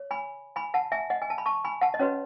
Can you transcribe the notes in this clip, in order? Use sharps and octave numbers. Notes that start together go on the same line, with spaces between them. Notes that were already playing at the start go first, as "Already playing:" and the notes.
Already playing: C#5
G#5 B5
G#5 B5
F#5 A5
E5 G#5
D#5 F#5
G#5
A5
B5
A5 C#6
G#5 B5
F#5 A5
D#5
C#4 F#4 B4 C#5